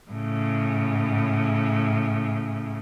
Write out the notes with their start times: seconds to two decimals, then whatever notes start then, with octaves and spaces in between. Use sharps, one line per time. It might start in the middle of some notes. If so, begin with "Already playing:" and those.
0.11 A2 C#3